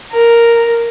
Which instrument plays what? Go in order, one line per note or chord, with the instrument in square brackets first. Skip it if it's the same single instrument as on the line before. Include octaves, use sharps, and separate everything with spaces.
[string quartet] A#4